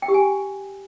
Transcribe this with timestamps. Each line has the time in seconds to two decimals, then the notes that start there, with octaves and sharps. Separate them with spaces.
0.02 G5
0.08 G4
0.14 G#5